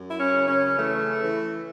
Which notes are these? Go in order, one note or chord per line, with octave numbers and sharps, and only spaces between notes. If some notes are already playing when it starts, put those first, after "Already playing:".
Already playing: F#2
E4
C#4
C#3
C#4
E3 A3
E3